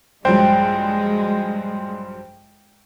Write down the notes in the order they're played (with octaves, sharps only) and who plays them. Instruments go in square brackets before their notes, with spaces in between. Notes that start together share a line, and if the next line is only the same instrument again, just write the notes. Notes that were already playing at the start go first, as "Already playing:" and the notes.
[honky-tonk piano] A#1 G2 F#3 [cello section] G#3 [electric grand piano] C5 [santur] G5